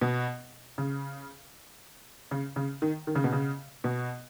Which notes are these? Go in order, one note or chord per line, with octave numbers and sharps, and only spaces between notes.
B2
C#3
C#3
C#3
D#3
D#3
C#3
B2
C#3
B2